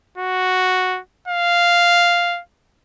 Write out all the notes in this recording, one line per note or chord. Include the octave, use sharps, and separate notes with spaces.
F#4
F5